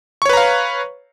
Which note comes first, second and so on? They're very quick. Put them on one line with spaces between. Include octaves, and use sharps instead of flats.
C#6 C#5 B4 A#5 F5